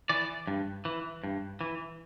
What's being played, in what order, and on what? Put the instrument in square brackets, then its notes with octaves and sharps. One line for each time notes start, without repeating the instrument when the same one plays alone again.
[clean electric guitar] E3 D5
G2
E3
G2
E3